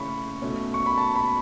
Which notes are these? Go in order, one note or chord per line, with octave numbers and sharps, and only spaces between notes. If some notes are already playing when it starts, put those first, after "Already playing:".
Already playing: C#3 A3 C#4 E4 B5 C#6
B2 A3 C#4
C#6
B5
A5
B5